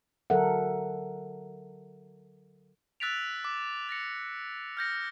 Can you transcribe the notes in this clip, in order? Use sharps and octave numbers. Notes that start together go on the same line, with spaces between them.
D3 F#3 A4 A#4 E5 F#5
E6 F#6 A6 B6 D7 F7
D6
D6 A6 A#6 C#7
F6 G6 A#6 C#7